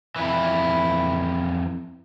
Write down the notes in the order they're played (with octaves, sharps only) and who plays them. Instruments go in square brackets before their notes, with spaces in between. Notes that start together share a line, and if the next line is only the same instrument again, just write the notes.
[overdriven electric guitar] F2 E3 [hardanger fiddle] E4